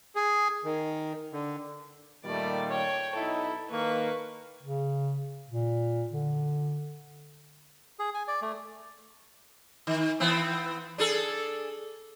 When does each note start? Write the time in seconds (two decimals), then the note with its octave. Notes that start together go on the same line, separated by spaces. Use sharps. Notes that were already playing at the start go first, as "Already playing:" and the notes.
0.16 G#4
0.64 D#3
1.33 D3
2.25 A#2 D#3 G3 A3 D5
2.69 C#5 G5
3.15 B1 D#4 E4 A4
3.70 D#3 A#3 B4 C#6
4.63 C#3
5.49 A#2
6.11 D3
7.99 G#4
8.14 G#5
8.28 D5
8.42 A3
9.87 D#3
10.20 E3 B3 C4
10.98 D4 G#4 A4